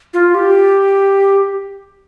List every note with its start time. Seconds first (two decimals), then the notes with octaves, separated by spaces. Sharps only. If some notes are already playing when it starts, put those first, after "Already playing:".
0.14 F4
0.34 G4